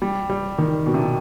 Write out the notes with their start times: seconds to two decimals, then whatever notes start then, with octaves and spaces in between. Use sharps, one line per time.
0.02 G3
0.30 G3
0.58 D#3
0.86 B2
0.94 C3
1.02 B2